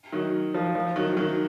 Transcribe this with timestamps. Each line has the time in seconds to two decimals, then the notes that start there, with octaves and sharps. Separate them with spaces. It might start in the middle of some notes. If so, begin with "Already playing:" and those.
0.12 D#3 F#3
0.54 F3
0.75 F3
0.96 D#3 F#3
1.17 D#3 F#3